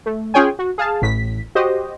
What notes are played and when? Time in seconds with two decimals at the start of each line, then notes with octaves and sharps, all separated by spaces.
0.06 A3
0.34 C#4 F4 G#4 C#5 G5 G#5
0.59 F#4
0.78 G#4 F5 A5
1.02 A1 A2 B6
1.55 F#4 G4 C5 D#5